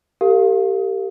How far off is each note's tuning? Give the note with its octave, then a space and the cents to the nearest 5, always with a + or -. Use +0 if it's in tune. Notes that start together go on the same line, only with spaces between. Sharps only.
G4 -5 A#4 -45 F5 +0